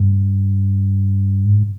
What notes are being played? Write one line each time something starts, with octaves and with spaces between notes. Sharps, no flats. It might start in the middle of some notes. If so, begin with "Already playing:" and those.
Already playing: G2
G#2